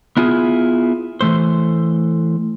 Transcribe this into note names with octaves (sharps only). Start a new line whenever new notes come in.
B3 E4 F4 G#4
E3 A3 C5